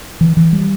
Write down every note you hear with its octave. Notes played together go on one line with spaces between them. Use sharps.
E3
E3
G3